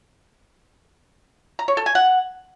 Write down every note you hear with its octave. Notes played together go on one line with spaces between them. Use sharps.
A#5
C#5
A4
G#5
F#5